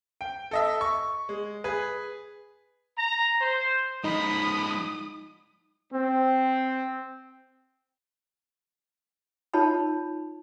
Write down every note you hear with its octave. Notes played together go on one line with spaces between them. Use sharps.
G5
A4 D#5 E5
C#6
G#3
G#4 B4
A#5
C5
F3 G#3 D#4 B5 D#6
C4
D#4 F4 C#5 A5 B5